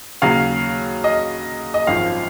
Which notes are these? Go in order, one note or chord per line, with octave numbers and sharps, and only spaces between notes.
D#2 C#3 F#3 F5
D#5
D#5
G#1 F#2 F3 F5